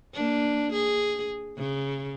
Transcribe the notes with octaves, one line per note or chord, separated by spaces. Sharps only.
A#3 D4
G#4
C#3